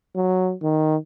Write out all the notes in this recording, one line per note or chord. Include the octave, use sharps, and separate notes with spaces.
F#3
D#3